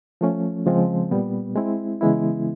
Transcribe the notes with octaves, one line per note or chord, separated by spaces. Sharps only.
F3 A3 C#4
C#3 F3 G#3 C4 F4
A#2 G3 B3
G#3 C4 E4
C#3 E3 G#3 B3 E4